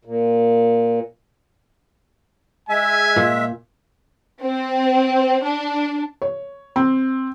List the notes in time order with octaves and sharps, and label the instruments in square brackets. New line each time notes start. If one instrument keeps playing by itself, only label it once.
[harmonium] A#2
[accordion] G#3 E5 [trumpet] G#5
[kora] A#2
[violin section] C4
D4
[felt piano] C#5
C4